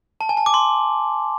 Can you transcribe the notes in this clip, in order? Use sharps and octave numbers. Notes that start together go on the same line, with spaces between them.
A5
G#5
A5
D6
C6